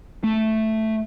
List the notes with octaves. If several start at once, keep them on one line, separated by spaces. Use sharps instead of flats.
A3